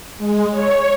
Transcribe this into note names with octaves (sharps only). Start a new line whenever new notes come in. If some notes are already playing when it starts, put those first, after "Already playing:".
G#3
C#5